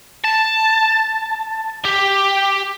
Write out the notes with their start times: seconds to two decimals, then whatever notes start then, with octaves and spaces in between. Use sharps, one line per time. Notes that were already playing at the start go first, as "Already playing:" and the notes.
0.25 A5
1.85 G4